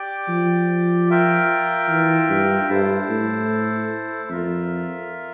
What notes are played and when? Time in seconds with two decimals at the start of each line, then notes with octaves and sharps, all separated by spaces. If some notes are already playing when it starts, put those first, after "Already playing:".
Already playing: G4 D5 G5
0.29 F3
1.10 F4 A#4 E5 G5
1.89 E3
2.29 G2
2.70 G2 E4 A4 C5
3.10 A2
4.30 F2 F4 A#4 E5